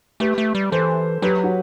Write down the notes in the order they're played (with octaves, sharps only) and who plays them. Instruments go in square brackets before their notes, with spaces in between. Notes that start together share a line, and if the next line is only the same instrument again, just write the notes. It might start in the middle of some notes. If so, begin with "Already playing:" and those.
[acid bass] A3 [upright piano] G4 B4
[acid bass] A3
G3
[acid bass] E3 [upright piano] A4 C5
[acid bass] F#3 [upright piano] G4 B4
[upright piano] F#4